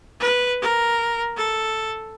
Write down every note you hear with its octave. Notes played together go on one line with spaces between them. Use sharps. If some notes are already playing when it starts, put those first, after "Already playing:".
B4
A#4
A4